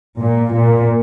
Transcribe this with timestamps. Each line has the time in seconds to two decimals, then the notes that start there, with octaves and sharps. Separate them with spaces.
0.21 A#2
0.55 A#2